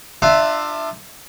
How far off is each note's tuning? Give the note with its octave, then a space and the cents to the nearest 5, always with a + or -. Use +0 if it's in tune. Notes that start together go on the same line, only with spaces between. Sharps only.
D4 +30 F4 +0 E5 +0